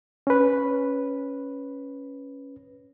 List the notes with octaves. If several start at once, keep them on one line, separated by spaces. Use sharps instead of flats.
C#4 B4